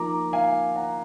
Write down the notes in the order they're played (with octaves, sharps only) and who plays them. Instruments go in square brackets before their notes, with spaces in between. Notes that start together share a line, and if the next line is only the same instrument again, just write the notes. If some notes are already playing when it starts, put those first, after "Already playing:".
Already playing: [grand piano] F3 A#3 D#4 A#5 D6
F5 G#5
F#5 A#5